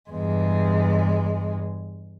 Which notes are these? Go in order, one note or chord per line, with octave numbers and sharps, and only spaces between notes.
E2 G2 G#3